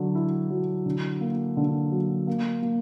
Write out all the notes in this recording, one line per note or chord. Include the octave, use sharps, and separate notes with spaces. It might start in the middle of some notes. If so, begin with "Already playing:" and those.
Already playing: D3 F#3
E4
F#3
D3
A#3
D3
F#3
A#3
A#3